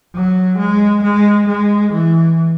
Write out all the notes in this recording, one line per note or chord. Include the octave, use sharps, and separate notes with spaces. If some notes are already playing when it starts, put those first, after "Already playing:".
F#3
G#3
G#3
G#3
E3